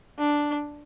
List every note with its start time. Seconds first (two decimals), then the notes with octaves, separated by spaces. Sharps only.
0.19 D4